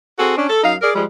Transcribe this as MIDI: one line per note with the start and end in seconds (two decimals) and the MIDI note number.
0.19 0.36 60
0.19 0.36 66
0.19 0.36 68
0.19 0.36 69
0.37 0.46 61
0.37 0.46 62
0.49 0.60 69
0.64 0.75 42
0.64 0.75 63
0.64 0.75 77
0.82 0.91 68
0.82 0.91 70
0.82 0.91 74
0.95 1.04 53
0.95 1.04 55
0.95 1.04 56